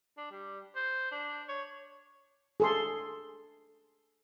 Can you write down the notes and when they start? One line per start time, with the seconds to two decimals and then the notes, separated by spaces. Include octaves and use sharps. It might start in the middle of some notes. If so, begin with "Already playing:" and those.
0.17 D4
0.31 G3
0.76 C5
1.11 D4
1.49 C#5
2.60 G#4 A4 C6